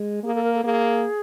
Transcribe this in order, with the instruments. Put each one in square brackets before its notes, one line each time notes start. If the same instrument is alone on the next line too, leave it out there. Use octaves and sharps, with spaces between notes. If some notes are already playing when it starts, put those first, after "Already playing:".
Already playing: [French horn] G#3
[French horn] A#3 [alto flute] G#4
[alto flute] A4
A#4
A4
[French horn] A#3 [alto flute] G#4